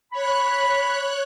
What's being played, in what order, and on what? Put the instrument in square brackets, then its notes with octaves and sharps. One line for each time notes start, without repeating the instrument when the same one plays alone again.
[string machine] C#5 F#6 [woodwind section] B5